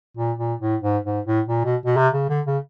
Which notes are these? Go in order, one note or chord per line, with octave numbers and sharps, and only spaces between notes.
A#2
A#2
A2
G#2
G#2
A2
A#2
B2
B2
C3
C#3
D3
C#3